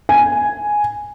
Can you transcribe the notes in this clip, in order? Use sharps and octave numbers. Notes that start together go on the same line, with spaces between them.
G#5